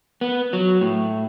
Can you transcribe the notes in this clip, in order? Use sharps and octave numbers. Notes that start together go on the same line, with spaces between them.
B3
F#3
A2